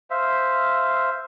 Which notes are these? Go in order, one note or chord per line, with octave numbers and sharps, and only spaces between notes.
C5 E5 F5